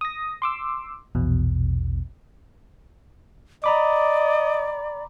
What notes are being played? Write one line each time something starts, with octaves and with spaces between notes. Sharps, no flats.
D#6 A#6
C6 D6 E6
A#1 E2 B2
D5 D#5 A#5 B5 D6